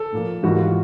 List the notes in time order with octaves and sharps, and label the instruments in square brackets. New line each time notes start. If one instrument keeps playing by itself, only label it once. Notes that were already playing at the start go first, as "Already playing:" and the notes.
Already playing: [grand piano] A4
A#2 F3 A#3
G#2 E3 G3 A#3 F#4
F4